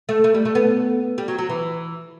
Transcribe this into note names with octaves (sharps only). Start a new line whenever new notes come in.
A3
A3
G3
A3
B3
G3
F#3
F#3
E3